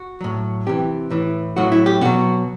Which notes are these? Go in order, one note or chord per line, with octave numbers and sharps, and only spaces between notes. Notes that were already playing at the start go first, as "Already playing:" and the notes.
Already playing: F#4
A2 F#3
C3 E3 G4
A2 E3
A2 F#3 F#4
E4
G4
B2 F#3 F#4